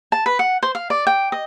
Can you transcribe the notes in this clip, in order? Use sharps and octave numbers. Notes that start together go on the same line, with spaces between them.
A5
B4
F#5
C5
F5
D5
G5
D#5